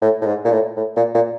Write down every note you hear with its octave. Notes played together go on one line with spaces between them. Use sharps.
A2
A2
G#2
A#2
A2
A2
A#2
A#2